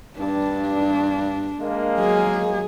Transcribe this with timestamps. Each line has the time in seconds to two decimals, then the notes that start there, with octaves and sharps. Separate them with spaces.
0.19 G2 D4
1.61 G#3 A#3
1.98 F#3 G#4